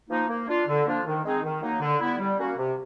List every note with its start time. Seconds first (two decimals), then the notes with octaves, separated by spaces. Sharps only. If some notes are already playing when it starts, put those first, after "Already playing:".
0.10 F3 A#3 D#4
0.29 A#3
0.48 D4 F4
0.68 D3
0.86 F3 A#3 D4 F4
1.06 D#3
1.24 G#3 C4 D#4 G#4
1.44 D#3
1.62 F#3 A#3 D#4
1.81 D3
2.00 G3 B3 E4
2.19 G3
2.38 A#3 C#4 F#4
2.58 C3